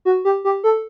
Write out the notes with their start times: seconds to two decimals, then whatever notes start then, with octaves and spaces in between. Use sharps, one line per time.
0.05 F#4
0.25 G4
0.45 G4
0.64 A4